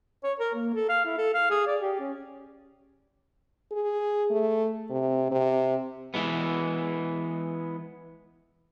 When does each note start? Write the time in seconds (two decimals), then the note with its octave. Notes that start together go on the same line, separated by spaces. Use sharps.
0.24 C#5
0.39 A#4
0.55 A#3
0.74 A4
0.89 F5
1.05 E4
1.18 A4
1.34 F5
1.51 G#4
1.67 D5
1.81 G4
2.00 C#4
3.72 G#4
4.30 A3
4.90 C3
5.32 C3
6.14 E3 G#3 B3